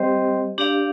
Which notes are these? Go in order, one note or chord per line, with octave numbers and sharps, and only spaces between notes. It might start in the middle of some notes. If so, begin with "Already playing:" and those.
Already playing: G3 C4 G4 C5 D#5
D4 G4 D5 F5